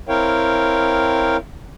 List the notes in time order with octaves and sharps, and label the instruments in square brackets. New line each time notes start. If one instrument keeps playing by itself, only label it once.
[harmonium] C4 E4 A#4 C#5 F5 G5